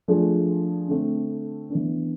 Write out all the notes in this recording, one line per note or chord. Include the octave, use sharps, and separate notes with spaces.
F3 A3 D4 G#4
D3 A3 C4
E3 B3 D4